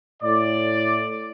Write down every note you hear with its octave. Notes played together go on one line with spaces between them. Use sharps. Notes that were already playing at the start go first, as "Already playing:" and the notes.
A2 D5